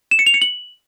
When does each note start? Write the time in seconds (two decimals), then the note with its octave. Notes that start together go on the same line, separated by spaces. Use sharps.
0.11 E7
0.19 C#7
0.26 F7
0.34 C#7
0.42 F#7